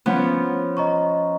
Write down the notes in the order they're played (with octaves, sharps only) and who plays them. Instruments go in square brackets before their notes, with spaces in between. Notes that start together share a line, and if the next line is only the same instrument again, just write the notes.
[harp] F3 B3 C#4
[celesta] D#5 A#5 C#6